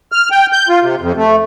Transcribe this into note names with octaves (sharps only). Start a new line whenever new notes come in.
F6
G5
G6
F4
C3
F2
A3